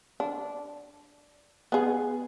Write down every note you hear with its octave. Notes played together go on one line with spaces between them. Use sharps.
D4
B3 G#4